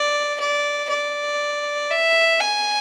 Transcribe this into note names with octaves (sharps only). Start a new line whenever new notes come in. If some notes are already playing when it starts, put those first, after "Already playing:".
Already playing: D5
D5
D5
E5
G#5